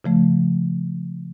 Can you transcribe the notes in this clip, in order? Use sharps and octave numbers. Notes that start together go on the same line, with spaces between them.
C#3 F3 A3